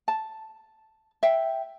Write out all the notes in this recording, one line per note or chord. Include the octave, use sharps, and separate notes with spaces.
A5
E5 G5